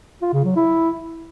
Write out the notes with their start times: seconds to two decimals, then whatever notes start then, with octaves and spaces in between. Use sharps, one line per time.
0.22 F4
0.33 C#3
0.45 F#3
0.56 E4